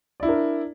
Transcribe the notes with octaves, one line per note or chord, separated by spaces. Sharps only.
D4 E4 A#4 D5